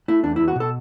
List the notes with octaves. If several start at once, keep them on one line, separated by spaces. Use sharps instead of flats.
A3 E4
E2 D4
E4
E2
F#4
B2 A4